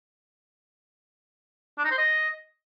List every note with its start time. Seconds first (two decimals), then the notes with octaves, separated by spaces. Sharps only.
1.78 D4
1.85 D#4
1.91 C5
1.98 D#5